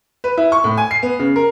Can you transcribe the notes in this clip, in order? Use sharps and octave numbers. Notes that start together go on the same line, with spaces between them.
B4
E4
C#6
A2
G#5
C7
B3
C#3
A#4